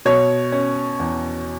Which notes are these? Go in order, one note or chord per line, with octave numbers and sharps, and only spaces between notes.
B2 C#5
C#4
E2